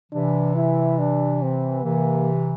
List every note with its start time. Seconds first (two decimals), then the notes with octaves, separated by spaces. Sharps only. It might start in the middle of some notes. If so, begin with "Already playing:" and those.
0.12 C3 E3 D4
0.55 E4
0.99 D4
1.42 C4
1.84 C3 E3 A#3